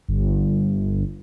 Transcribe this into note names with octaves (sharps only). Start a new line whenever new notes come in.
G1